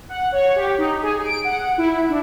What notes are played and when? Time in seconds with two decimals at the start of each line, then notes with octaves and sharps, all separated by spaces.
0.09 F#5
0.32 C#5
0.56 G4
0.78 D#4
1.02 G#4
1.25 D7
1.44 F#5
1.78 E4
2.09 D4